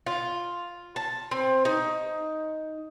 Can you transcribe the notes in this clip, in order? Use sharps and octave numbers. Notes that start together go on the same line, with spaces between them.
F4
A5
C4
D#4